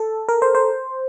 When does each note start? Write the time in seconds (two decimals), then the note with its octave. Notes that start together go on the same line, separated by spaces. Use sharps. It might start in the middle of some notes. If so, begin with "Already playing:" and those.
Already playing: A4
0.29 A#4
0.42 C5
0.55 C5